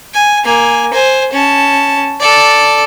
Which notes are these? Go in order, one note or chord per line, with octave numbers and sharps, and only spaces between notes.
G#5
A#3 G#5
C5 G#5
C#4 A5
A4 D5